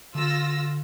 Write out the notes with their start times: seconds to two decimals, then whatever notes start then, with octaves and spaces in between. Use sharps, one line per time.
0.15 D3 F4 E6 A#6